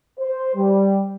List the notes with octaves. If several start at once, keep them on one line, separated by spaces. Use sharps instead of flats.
C5
G3